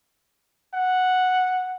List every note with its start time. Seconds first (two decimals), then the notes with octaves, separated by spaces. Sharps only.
0.74 F#5